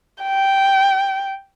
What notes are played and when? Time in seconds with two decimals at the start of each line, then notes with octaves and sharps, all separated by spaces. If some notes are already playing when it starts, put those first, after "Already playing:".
0.23 G5